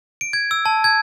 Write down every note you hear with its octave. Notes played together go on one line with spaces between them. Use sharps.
D7
G#6
E6
A5
G#6